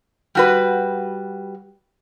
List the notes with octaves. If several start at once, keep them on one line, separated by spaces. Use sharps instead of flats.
G3 F#4 B4